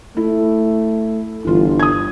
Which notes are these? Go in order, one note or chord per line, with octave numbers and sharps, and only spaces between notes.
A3 E4
G1 E3 F4
D#6 G#6